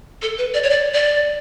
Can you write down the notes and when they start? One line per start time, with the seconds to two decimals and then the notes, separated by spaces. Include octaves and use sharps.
0.22 A4
0.38 B4
0.54 D5
0.63 C#5
0.70 D5
0.94 D5